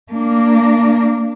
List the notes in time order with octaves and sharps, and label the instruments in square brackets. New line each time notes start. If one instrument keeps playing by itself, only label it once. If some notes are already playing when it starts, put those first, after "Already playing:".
[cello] A#3 D4